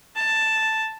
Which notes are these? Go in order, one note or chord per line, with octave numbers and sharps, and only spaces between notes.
A5